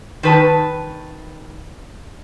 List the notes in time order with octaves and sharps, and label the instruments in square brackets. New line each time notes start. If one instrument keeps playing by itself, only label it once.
[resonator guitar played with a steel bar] D#3 B4 A5